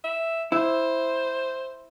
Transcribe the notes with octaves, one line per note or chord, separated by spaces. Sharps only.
E5
E4 C5